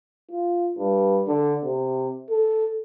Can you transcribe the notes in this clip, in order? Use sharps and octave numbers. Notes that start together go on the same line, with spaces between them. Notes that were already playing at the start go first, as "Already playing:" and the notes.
F4
G2
D3
C3
A4